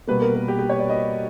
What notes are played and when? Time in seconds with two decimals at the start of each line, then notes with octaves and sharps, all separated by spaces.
0.07 B2 G3 A#3 B4
0.22 A#4
0.35 A#4
0.48 G4
0.59 G4
0.69 C#5
0.79 D5
0.89 D#5